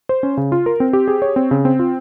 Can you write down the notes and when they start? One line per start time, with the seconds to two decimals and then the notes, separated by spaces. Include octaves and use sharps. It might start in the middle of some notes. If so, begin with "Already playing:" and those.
0.09 C5
0.23 C#4
0.37 C#3
0.52 F4
0.66 A#4
0.80 C4
0.93 G4
1.08 G#4
1.22 C#5
1.36 C4
1.51 C#3
1.65 C4
1.79 F4